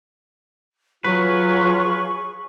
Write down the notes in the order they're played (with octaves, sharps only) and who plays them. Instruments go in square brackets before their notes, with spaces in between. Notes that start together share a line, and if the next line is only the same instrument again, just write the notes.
[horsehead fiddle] F#3 [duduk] F4 [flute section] G#4 C#6 [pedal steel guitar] B4